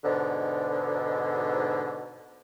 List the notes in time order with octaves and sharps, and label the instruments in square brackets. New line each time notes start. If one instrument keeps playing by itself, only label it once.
[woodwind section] G#2 B2 D3